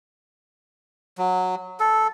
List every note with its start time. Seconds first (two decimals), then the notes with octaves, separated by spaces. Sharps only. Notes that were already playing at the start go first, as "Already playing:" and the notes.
1.18 F#3
1.80 A4